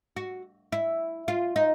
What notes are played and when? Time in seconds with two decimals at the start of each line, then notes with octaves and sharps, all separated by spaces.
0.17 F#4
0.72 E4
1.28 F4
1.56 D#4